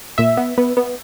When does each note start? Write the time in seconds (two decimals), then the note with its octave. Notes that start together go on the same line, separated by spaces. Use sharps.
0.18 A#2 E5
0.37 B3
0.58 B3
0.77 B3